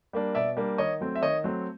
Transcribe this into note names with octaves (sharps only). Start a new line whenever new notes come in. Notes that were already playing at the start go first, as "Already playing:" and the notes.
G3 A#3 D4
B2 D5 E5
G3 A#3 D4
D#3 C#5 D#5
F#3 A3 C4
E5
D#3 C#5 D#5
F#3 A3 C4